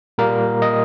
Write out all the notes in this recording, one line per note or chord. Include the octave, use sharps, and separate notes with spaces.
A#2 G3 A#3 A#4
D#5